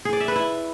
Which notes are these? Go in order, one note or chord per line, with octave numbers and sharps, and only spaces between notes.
G#4
D5
E5
B4
E4